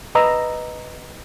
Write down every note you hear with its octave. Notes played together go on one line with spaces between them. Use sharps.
B4 D#5 A#5 E6